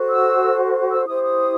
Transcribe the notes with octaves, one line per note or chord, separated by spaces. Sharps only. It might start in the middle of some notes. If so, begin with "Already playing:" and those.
Already playing: F#4 A4 C5
E6
E6
E4 G4 C5 D#6
D#6